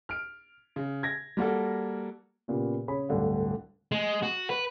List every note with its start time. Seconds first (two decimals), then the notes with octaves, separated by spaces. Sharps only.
0.09 F6 D7
0.76 C#3
1.03 G#6 A#6
1.37 G3 A#3 F#4 A4
2.48 A#2 C#3 B3 G4
2.88 C#3 G#4 C#5 B5
3.09 D1 G2 D3 F5
3.92 G#3
4.23 F#4
4.50 B4